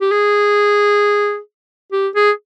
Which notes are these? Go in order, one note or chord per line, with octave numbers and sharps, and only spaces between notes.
G4
G#4
G4
G#4